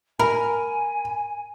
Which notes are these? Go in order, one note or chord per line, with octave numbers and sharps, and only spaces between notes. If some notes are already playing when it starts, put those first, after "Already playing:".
A#4 G#5 B5